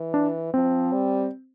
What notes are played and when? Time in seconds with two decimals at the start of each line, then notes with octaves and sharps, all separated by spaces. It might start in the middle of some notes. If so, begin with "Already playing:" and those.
Already playing: E3
0.14 D4
0.54 F3 C4
0.93 G3